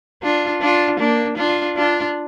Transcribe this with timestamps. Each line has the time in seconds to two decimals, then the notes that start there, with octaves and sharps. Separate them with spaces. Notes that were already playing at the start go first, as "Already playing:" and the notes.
0.23 D4 F4
0.61 D4 F4
0.99 A#3 D4
1.37 D4 F4
1.76 D4 F4